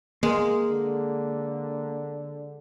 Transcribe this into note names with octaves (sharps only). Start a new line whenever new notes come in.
G#3 A#3
D3